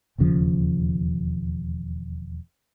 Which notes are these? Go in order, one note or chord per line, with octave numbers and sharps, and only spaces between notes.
E1 D#2 C#3 F3